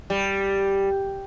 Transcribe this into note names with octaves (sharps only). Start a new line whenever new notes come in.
G3